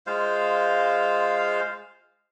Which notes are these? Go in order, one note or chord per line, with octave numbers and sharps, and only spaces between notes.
G#3 F4 C5 F5